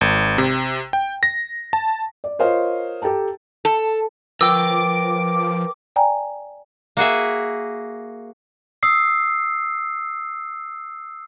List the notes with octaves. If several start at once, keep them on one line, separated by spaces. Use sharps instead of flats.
G#1
C3
G5
A#6
A5
D5
F4 A#4 C5 C#5 D#5 F5
G4 A4 G5 A5 A#5
A4
F3 A#4 B4 G5 D6 E6
D5 G5 G#5 A#5
A#3 F#4 G#4 E5
D#6 E6 C7